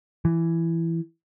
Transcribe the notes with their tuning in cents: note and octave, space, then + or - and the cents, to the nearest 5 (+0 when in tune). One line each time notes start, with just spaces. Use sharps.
E3 +10